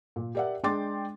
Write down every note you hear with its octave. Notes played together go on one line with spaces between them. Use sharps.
A#2
G4 A#4 D5 E5 F#5
G#3 D4 G5 C6 D6 A6